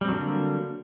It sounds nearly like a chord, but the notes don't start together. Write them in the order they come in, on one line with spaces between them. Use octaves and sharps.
G3 C4 F#3 D3 A#3